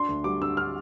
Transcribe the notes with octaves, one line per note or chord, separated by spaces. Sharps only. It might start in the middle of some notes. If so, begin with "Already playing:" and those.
Already playing: D4 C6
D2
G3 D6
D3 E6
D4 F6